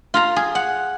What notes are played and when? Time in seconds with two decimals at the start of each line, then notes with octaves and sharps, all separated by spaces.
0.14 F4 F5 A#5
0.36 G#4
0.55 F#5